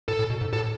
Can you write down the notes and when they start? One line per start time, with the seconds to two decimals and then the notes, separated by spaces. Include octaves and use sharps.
0.08 A2 A4
0.19 A2
0.30 B2
0.41 G#2
0.53 A2 A4